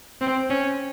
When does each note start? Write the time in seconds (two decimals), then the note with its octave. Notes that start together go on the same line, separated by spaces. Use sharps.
0.21 C4
0.50 C#4